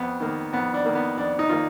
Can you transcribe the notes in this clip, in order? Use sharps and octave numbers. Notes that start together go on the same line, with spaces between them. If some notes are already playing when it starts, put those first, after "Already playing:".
Already playing: F2 B3
D#3 A#3
F2 B3
D4
D#3 A#3
B3
F2 D4
D#4
D#3 A#3 F4